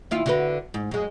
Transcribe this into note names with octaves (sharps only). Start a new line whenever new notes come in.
D#2 E4 F4
D3 F#4 B4
G#2
F#2 G#3